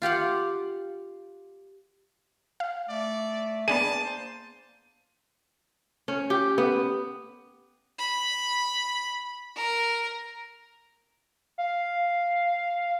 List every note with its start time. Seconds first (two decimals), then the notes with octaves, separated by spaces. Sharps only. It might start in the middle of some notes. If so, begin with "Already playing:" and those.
0.02 F4 G4 F5 F#5
2.60 F5
2.89 A3 D5
3.68 A#3 B3 D4 G#4 A5 D#7
4.04 C5
6.08 C#4
6.30 G4
6.58 B3
7.99 B5
9.56 A#4
11.58 F5